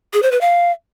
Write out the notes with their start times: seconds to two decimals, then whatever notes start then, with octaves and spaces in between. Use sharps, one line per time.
0.13 G#4
0.23 C5
0.32 B4
0.41 F5